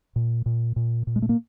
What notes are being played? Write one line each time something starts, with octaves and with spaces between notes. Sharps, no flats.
A#2
A#2
A#2
A#2
G#3
A3
A#3